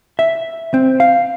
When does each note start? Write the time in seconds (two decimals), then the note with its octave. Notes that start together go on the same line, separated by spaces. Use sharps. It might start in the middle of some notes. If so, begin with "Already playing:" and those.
0.19 E5
0.74 C4
1.00 F5